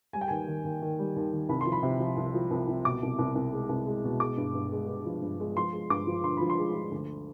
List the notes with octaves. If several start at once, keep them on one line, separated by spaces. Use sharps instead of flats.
G3 G#5
G5
D#2 G#5
D#3
D#2
D#3
G3
D#2
D#3
C2 B5
C6
F3
B5
C3
F3
C2
F3
C2
C2
B2 D6
C2
C2
C2
G#3
C2
G#3
B2
G#3 D6
G2
G2
G#3
G#3
F3
G2
G#3
F3 C6
G#3
G2 D6
F3
D3 C6
F3 B5
C6
G#3
F3
D2